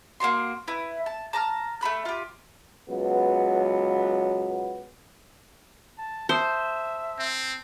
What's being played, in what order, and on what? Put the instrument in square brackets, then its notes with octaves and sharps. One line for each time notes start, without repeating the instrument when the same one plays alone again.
[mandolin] A#3 C4 F#4 C6
E4 B4
A5
A5 A#5 D#6 F6
A3 F#4 B5 F#6
F4 G4
[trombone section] C#2 F#3 B3
[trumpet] A5
[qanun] C5 [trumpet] E5 [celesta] A5 D#6
[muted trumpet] C4